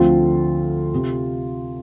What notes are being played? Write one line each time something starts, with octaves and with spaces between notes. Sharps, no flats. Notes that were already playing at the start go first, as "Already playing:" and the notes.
Already playing: D2 D3 F3 A3 C4 F4
C3